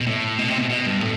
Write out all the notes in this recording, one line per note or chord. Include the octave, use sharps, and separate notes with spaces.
B2
A2
B2
C3
B2
B2
G2
A2